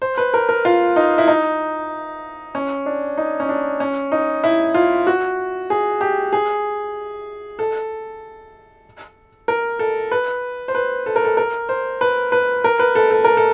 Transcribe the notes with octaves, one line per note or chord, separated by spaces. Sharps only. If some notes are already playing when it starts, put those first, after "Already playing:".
C5
B4
A#4
A#4
F4
D#4
E4
D#4
C#4
D4
D#4
C#4
D4
C#4
D#4
E4
F4
F#4
G#4
G4
G#4
A4
A#4
A4
B4
C5
B4
A4
A#4
A4
A#4
C5
B4
B4
A#4
B4
A4
A4
A#4
A4